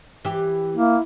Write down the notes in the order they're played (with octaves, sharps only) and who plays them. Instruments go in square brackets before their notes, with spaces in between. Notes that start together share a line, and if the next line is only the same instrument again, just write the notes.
[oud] E3 G4
[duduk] A#3 [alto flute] E4